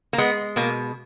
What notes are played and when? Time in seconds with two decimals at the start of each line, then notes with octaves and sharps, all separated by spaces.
0.13 A#3
0.18 G#3 B3
0.56 B2 A#3